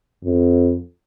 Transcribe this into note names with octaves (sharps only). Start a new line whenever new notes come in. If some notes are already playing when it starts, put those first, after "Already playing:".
F2